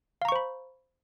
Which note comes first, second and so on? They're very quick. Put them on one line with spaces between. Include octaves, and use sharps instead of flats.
F5 A#5 C#6 C5 B5